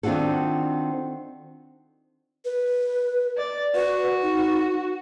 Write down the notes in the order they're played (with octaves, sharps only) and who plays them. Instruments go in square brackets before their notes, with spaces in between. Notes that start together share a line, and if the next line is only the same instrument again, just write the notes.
[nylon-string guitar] D#3 C4 D4 F4 F#4 A4
[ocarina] B4
[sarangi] D5
[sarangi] F#4 [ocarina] B4
[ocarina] D#4